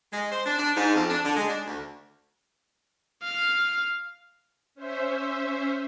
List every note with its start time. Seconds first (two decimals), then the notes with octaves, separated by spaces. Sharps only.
0.12 G#3
0.30 C5
0.46 D4
0.58 D4
0.75 G#2
0.95 F2
1.09 D4
1.23 D3
1.35 G#3
1.47 D4
1.66 D2
3.23 F5
4.75 C#4 C5 E5